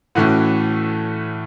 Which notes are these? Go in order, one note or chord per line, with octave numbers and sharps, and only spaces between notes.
A2 E3 A3 C#4 F#4